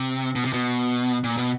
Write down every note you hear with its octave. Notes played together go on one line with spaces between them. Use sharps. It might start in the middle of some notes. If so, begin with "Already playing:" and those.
Already playing: C3
B2
C3
B2
A#2
B2